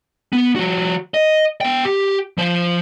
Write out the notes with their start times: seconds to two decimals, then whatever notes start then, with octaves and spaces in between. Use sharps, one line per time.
0.33 B3
0.56 F3 F#4
1.14 D#5
1.61 B3 G5
1.85 G4
2.38 F3 C5